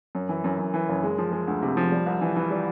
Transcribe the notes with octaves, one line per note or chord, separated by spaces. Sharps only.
F#2
E3
F#2
F#2
E3
F#1
G#3
F3
G#3
D2
C3
F3
G3
C2
E3
E3
G3